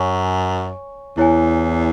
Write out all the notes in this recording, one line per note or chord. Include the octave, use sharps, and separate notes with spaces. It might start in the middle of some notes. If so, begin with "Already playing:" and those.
Already playing: F#2 C#5 G#5 C#6
E2 E4 C#5 G#5